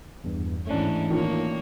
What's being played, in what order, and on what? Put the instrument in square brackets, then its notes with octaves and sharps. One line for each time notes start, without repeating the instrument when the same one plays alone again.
[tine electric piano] E2 G2
[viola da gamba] G#2 E3 C#4 [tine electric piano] A3 D4
[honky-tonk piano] A#2 D#3 [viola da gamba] A#3 C#5